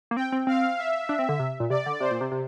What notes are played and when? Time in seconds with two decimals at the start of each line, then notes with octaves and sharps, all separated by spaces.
0.11 A#3
0.16 C4 G5
0.32 C4
0.47 C4 F5
0.78 E5
1.09 D4
1.19 C4
1.29 D3
1.39 C3
1.60 A#2
1.70 C3 D5
1.86 D3
2.00 C3 C5
2.11 A#2
2.21 C3
2.32 C3